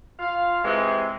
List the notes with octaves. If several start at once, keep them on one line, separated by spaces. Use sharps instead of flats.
F4 F5
C3 E3 G#3